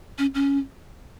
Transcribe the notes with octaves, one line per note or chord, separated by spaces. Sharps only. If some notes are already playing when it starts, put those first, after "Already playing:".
C#4
C#4